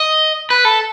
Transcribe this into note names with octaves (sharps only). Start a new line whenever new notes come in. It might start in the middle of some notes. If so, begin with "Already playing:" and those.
Already playing: D#5
B4
A4